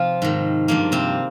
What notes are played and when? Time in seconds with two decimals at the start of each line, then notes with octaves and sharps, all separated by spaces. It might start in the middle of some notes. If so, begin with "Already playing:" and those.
Already playing: C3 F3 C4 F4
0.22 G#2 D#3
0.68 G2 F3 A#3
0.92 C3 C4